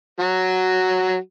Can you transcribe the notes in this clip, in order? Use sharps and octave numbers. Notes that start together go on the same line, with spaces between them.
F#3 F#4